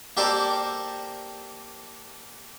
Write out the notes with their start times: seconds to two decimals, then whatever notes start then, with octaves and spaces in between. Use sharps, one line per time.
0.17 A#3 G4 A4 A#4 C5 D5